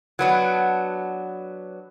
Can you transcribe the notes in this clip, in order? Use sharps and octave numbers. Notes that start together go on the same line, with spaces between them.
F#3 B3 D4